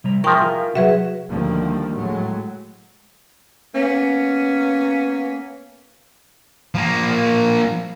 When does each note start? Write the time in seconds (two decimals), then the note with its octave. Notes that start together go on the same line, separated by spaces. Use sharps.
0.04 C3 G3 A#5
0.24 F3 E4 G#4 A#4 E5 G5 C#6
0.41 F4 A#4
0.75 C3 F#3 F#4 G#4 B4 E5
1.30 D2 D#3 F3 G3 A3 A#3
1.94 A2 F#3 G#3
3.75 A#3 B3 C#4
6.75 F3 A#3